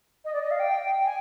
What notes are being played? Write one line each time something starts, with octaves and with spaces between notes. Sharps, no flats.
D#5
D5
D#5
F5
G5
G#5